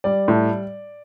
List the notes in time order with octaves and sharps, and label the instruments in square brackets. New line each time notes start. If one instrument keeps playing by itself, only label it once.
[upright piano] G3 D5
A2